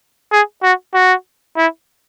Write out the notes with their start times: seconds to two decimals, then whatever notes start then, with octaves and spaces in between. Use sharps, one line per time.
0.32 G#4
0.63 F#4
0.94 F#4
1.57 E4